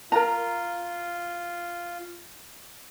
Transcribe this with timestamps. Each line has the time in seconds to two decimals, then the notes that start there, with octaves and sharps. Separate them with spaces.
0.12 F4 A#4 A#5